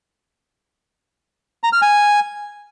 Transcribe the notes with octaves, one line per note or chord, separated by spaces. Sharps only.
A#5
F6
G#5